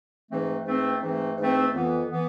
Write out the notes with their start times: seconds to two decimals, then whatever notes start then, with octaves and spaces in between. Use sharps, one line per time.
0.29 G#2 E3 A3 C4
0.65 G#2 E3 A3 C4
1.02 G#2 E3 A3 C4
1.38 G#2 E3 A3 C4
1.74 F2 E3 B3
2.11 E3 B3